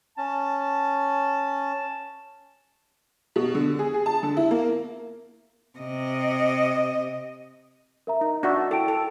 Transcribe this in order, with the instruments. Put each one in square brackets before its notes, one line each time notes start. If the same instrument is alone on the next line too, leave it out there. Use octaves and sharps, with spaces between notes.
[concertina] C#4 [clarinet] A5
[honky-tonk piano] B2
D3
G#4
G#4
A5
D3
E4
A#3
[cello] C3 D#5
[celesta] A#4 E5 A#5
[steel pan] D#4
[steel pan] D4 F#4 E5 [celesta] C#6 A#6
[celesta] E4 G5 D7 [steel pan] A4
[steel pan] A4